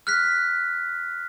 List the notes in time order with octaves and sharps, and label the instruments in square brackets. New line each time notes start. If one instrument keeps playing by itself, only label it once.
[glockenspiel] F6 F#6 B6